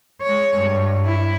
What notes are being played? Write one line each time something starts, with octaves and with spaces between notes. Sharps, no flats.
G#3 C#5
G2
E4